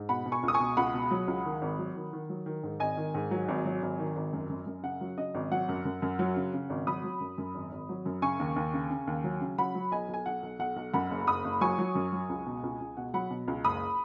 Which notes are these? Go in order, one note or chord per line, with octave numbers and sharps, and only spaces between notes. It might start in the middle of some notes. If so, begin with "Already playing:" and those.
Already playing: G#2
B2 F#5 B5
B2
G#5 C#6
C#2
D#6
G#5 C#6
B2
C#2 F#5 B5
B2
F#3
C#2
D#3
G#1
F#3
D#3
D#3
F#3
D#3
G#2
G#1 D#5 G#5
D#3
G#2
F#3
G#1
F#3
G#1
D#3
G#1
F#2
F#2
F#2
C#3 F#5
F#3
C#3 D#5
G#1
F#3 F#5
F#2
F#2
F#2
F#3
C#3
C#3
G#1
F#3 B5 D#6
F#3
F#2
F#2
G#1
G#1
F#3
F#2
C#3 G#5 C#6
D#2
D#2
C#3
C#3
D#2
F#3
C#3
F#3 F#5 B5
F#3
B1 D#5 G#5
B1 G#5
B1 F#5
B1
B1 F#5
B1
F#2 F#5 B5
F#1
F#1 B5 D#6
F#1
F#3 G#5 C#6
F#3
F#2
F#3
C#2
B2
C#2
C#2
B2 F#5
F#3 F#5 B5
B2
C#2
F#1 B5 D#6